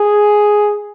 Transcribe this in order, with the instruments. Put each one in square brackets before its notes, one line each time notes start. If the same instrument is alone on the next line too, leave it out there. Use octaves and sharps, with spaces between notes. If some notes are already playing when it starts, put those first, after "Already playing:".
Already playing: [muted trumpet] G#4